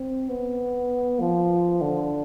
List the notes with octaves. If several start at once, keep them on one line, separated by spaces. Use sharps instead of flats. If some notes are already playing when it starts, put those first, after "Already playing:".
Already playing: C4
B3
F3
D3